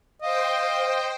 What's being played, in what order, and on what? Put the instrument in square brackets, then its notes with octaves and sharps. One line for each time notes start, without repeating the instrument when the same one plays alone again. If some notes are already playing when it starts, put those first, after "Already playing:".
[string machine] C5 G5 [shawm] D#5 [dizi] F5